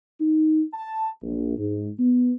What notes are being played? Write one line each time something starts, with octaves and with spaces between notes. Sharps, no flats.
D#4
A5
A#1
G#2
B3